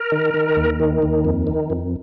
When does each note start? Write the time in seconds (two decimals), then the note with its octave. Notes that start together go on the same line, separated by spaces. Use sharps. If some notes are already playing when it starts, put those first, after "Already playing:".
Already playing: A#4
0.12 D#3
0.34 D#3
0.57 D#2
0.80 D#3
1.02 D#2
1.25 F2
1.47 D#3
1.70 F2